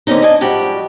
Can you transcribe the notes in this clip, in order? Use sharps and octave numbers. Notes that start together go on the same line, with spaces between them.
D3 A#3 C4 C#4 D#4
D4 D#4 D#5 G#5 A5
G#2 F3 G3 F#4 G4 A5